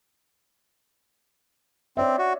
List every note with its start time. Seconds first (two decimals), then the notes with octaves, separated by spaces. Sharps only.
1.97 C4 C#5 D5 E5
2.19 F#4